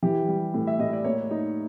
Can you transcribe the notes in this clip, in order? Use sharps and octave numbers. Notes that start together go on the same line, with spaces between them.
E3 G4
G3
A2
E5
A2 D#5
D5
A#3 C#5
D#4